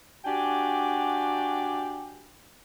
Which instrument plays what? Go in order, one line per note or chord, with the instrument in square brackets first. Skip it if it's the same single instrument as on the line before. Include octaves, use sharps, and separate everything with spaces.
[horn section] D4 F#4 G4 G5 G#5